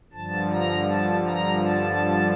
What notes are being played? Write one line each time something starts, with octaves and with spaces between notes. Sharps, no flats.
G2 D3 F3 A5
A#5
A5
A#5
A5